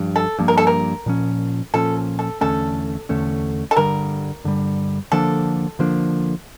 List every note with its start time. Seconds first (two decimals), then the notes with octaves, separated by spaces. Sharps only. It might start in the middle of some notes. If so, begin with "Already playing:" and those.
Already playing: G2 F3
0.16 A4
0.39 G2 F3 A#3
0.48 A#4
0.58 A4
0.67 A#4
1.06 A#2 F3 C#4
1.74 A#2 F3 C#4 A4
2.19 A4
2.41 E2 D3 A3 C#4 A4
3.09 E2 D3 A3 C#4
3.71 A4
3.76 G2 D3 G3 A#4
4.44 G2 D3 G3
5.12 D3 F3 A#3 D4 A4
5.79 D3 F3 A#3 D4